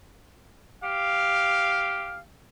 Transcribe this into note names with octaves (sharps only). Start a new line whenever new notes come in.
G4 F5